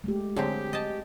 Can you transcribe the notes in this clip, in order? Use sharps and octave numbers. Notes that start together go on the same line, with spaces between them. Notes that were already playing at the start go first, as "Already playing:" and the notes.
G#3 A3 G4
D3 F#3 C4 G4 G#4
D#5 A5